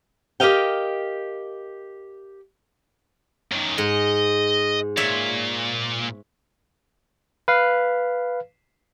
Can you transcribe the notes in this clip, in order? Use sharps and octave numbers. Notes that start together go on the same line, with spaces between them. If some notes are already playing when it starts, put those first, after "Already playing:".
G4 A#4 C5 D#5 F5 G5
F#2 D#3
G#2 D#5
A#2 C#5 E5
B4 F5